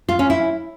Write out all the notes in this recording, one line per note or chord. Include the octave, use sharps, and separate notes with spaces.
F4
C#4
E4